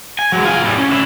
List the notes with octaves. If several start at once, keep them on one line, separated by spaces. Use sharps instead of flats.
G#5
F#3 G#3
F4 G#5
A2 G3
C#4
D3 E4